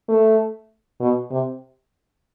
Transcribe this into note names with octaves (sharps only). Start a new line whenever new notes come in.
A3
B2
C3